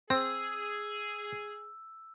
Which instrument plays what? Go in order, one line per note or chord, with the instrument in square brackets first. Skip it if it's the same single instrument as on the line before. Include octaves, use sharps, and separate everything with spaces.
[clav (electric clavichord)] C4 [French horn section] G#4 [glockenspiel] E6